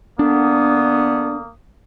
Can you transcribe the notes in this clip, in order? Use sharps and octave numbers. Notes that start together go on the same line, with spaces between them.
D3 A#3 B3 D4 D#6